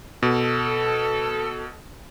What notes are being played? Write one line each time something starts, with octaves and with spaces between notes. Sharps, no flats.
B2 A4